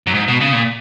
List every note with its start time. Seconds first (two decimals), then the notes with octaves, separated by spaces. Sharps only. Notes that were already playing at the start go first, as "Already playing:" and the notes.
0.07 F#2
0.15 G#2
0.28 B2
0.41 C#3
0.53 A#2